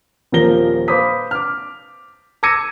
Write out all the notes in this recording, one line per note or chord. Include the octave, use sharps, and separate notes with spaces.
D#1 A#2 F3 A#4 A#6 G7
B4 C5 F5 D6 D#6 B6
D6 F6
D6 E6 G#6 A#6 C#7 D#7